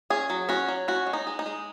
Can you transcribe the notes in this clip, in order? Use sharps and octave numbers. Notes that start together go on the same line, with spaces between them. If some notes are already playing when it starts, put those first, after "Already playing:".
C#4 G#4
F#3
C#4 F#4
F#3
C#4 F#4
G#3
D#4
G#3
D#4
G#3